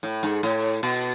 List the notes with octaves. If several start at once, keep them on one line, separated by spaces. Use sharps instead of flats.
A2
G#2
A2
B2